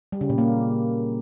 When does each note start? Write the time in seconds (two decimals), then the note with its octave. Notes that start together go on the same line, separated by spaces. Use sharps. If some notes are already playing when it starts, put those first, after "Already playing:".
0.12 G3
0.21 C#3
0.29 A#2
0.38 A#3